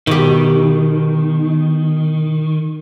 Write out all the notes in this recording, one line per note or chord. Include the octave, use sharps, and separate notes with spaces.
B2 D#3 G4